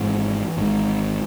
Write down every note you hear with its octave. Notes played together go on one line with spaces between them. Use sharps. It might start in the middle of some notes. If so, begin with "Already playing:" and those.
Already playing: G#1 G#2 E3
G#1 G#2